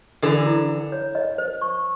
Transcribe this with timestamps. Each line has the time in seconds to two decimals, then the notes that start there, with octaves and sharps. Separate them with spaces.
0.22 D3 E3 A4
0.47 E4
0.69 E4
0.92 C#5
1.15 D#5
1.38 C5
1.62 C#6